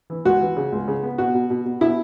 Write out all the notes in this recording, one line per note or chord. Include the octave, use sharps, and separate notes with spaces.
E3
C#2 F#4
E3
C#3
C#2
C#3
B3
B2 F#4
B2
B2
B2
B2 E4